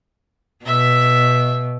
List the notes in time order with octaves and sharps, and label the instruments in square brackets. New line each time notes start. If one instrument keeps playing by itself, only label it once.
[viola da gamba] B2 [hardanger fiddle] E5